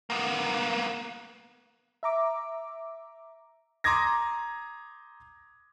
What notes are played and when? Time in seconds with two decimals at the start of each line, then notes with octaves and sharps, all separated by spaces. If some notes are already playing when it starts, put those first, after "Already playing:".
0.10 A#3 B3
2.03 E5 A#5 D6
3.84 A#5 C6 D6 D#6 G#6 A#6